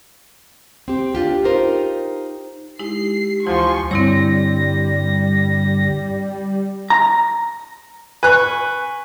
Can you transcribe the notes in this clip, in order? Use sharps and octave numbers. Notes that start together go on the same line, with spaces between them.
C4 G4
D4 F4 G4
D#4 F4 G4 A#4 C5
G#3 D#4 E4 G4 C7
D2 E3 F3 E4 G#5 C6 C#6
G2 D3 G3 C4 E4 C#5 A#6
A#5
B4 G#5 C#6 F#6